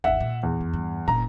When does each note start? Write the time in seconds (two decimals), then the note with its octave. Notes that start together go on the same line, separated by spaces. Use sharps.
0.04 G#1 E2 E5 F#5
0.20 A#2
0.43 E2
0.60 F2
0.74 G2
1.08 F#1 A#2 A#5